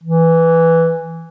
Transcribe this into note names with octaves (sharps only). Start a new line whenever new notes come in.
E3